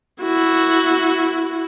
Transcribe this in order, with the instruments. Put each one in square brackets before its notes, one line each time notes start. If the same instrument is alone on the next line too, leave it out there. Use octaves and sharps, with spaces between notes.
[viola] E4 F#4